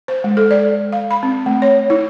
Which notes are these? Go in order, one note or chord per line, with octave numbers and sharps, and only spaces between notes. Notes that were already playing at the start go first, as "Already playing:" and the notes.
C5
G#3
A4
D5
F5
B5
C4
A3
C#5
E4